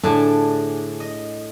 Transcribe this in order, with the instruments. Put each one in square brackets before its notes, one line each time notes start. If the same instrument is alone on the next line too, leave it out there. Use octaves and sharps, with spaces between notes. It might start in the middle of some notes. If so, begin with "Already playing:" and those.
[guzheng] A2 D3 G#4 [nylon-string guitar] D4 A5
[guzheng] D#5